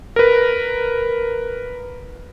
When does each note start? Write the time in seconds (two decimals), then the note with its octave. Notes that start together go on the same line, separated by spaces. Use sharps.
0.16 A#4 B4